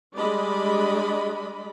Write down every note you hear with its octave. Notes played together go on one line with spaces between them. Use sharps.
G3 G#3 D4 D5 D#5 B5